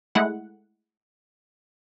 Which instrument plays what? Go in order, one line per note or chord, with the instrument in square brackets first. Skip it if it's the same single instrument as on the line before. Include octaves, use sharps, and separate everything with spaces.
[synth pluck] G#3 A3 E4 F#5